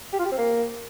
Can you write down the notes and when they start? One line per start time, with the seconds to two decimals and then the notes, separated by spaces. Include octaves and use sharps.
0.13 G4
0.19 F4
0.26 G4
0.32 C4
0.38 A#3